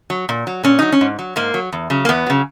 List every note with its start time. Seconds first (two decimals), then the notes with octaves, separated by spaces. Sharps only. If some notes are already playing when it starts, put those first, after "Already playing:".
0.10 F#3
0.29 A#2
0.47 F#3
0.63 A#2 C#4
0.79 F#3 D#4
0.92 C#4
1.01 G#2
1.19 F#3
1.36 G#2 A#3
1.54 F#3
1.72 E2
1.90 C#3 F#3
2.05 A#3
2.09 E2 B3
2.26 C#3 F#3